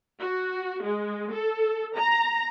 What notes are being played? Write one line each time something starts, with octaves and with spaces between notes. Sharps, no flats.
F#4
G#3
A4
A#5